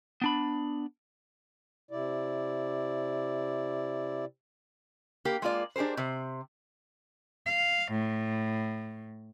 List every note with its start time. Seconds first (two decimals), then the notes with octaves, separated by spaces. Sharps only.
0.22 B3 D4 B5
1.91 C3 E4 D5
5.25 A#3 G4
5.42 G#3 A#3 F4 D5
5.76 D4 G4 G#4 A#4 C5
5.97 C3 C5
7.46 F5
7.92 A2